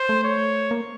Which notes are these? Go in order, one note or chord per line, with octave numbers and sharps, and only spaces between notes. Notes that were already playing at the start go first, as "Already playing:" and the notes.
Already playing: C5
A3
C#5
A#3